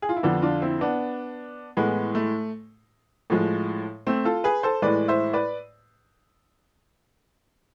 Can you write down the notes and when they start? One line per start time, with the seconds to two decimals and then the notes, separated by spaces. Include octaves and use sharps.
0.02 G#4
0.09 F4
0.17 E4
0.23 F2 D3 F3 B3 D4
0.42 D4 F4
0.62 C4 E4
0.81 B3 D4
1.77 A2 E3 G#3 B3
2.15 A3
3.30 A2 F3 G#3
4.07 A3 C4
4.25 F4 A4
4.44 G#4 B4
4.63 A4 C5
4.82 A2 E3 G#3 B4 D5
5.08 C5 E5
5.33 B4 D5